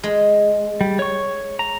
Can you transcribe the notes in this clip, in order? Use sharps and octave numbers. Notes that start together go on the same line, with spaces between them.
G#3
G3
C#5 C#6
A#5